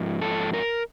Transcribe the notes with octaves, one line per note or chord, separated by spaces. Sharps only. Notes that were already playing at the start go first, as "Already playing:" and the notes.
Already playing: G#2 F3
A4
A#4